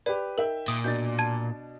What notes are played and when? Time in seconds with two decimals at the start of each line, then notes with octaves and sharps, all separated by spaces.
0.06 G4 B4 D5
0.38 D#4 A#4 E5 G5
0.68 A#2 D#6
0.84 B2 D4 G6 A6
1.19 A5 G#6 D#7